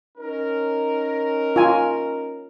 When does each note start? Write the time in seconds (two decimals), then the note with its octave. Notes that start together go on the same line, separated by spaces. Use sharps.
0.18 C#4 D#4 A#4
1.56 F4 G#5